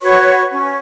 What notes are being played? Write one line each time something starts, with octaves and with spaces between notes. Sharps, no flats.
F#4 B4 C#5 C#6
C#4